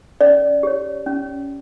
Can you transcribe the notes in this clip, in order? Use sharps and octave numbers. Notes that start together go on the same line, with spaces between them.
C#4 D5
G4 C#5
C#4